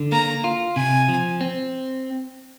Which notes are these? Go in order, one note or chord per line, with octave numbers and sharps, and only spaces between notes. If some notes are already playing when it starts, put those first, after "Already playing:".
Already playing: D3
A#3 A#5
F4
C3 G#5
F3
C4